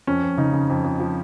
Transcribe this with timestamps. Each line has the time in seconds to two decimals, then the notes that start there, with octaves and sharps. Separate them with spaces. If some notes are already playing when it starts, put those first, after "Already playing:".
0.07 F2 C#4
0.23 F2
0.37 C#3 D#4
0.53 C#3
0.70 F2
0.84 F2
1.00 F3